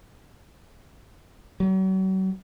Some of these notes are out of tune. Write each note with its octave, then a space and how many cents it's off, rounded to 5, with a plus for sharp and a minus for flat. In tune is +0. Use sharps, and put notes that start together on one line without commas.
F#3 +40